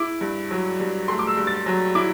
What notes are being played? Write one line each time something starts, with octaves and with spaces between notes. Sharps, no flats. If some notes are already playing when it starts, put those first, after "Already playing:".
Already playing: E4 D6
G2
F#3
G2
A3 C6
D6
E6
G2
A6
F#3
E4 D6